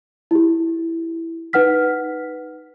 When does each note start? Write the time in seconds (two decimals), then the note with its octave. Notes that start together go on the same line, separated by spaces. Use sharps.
0.31 E4 G4
1.53 D#4 B4 F#5 F6 B6